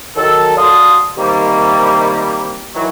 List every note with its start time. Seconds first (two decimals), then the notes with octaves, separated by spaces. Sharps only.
0.16 D#3 F#3 A4
0.56 F#4 D5 F5 A5 C6 D#6
1.17 C3 D#3 G3 A#3
2.75 D#3 E3 F#3